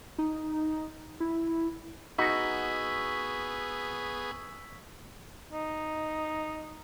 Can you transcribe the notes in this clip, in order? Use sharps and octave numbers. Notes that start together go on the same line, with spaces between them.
D#4
E4
B3 D#4 F#4 G#4 C#6 E6 B6
D#4